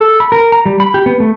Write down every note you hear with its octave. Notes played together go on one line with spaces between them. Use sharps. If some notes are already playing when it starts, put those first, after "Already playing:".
A4
B5
A#4
A#5
G3
B5
G4
B3
A3